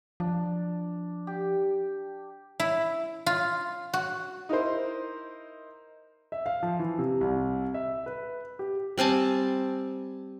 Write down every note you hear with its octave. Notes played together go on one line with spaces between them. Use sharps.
F3 D4
G4
E4
F4
F#4
D#4 E4 A#4 C5
E5
F5
F3
E3
C3
C2
E5
B4
G4
G3 C4 G#5 A5